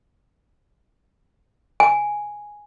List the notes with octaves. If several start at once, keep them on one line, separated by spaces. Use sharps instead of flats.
G#5